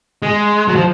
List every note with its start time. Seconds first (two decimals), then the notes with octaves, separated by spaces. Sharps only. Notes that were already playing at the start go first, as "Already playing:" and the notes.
0.22 G#3
0.68 F#3
0.75 F3